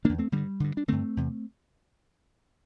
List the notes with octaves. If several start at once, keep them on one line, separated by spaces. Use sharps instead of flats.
E2 D3 A#3 D4
A3 C4
G2 D3 G3 A#3
G2 D3
D4
G2 D3 A3 C4
E2 C3